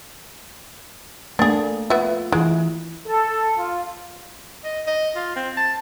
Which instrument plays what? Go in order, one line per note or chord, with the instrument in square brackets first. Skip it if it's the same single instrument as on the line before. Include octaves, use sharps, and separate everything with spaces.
[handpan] A3 A#3 [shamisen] D4 G#4
[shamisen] B3 E5 [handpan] F4
[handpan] E3 E4 [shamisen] G#3
[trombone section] A4
F4
[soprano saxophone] D#5
D#5
F4
C4
A5